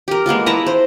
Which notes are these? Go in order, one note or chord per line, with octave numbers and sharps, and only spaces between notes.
G4 A#4
G#3 A#3 B3 F4
E4 B4 A5 A#5
C5